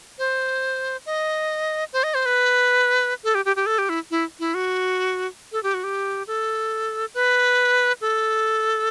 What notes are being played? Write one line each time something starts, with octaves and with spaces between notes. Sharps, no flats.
C5
D#5
C5
D#5
C5
B4
A4
G4
G4
G4
A4
G4
E4
E4
E4
F#4
A4
G4
F#4
G4
A4
B4
A4